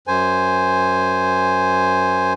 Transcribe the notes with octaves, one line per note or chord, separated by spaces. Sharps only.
F#2 C5 G#5